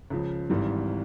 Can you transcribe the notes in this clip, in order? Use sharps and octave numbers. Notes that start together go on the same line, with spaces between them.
C#2 C#3 F3
G#1 G#2 E3 G3